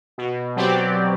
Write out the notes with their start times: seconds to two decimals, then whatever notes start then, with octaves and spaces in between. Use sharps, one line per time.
0.18 B2
0.56 F#3 C4 G4 D5
0.96 B2